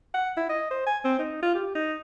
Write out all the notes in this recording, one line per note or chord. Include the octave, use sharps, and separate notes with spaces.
F#5
E4
D#5
C5
G#5
C4
D#4
F4
G4
D#4